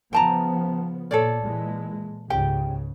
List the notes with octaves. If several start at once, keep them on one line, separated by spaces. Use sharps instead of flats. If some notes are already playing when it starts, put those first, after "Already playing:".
C#3 F3 B3 G5 A5 A#5
A#2 A4 C#5 D5
A#2 E3 G#3
C#2 G#2 C#3 G4 G5